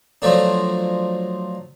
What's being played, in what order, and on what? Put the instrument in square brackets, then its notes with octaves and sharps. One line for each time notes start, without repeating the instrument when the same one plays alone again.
[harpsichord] F3 F#3 A3 D4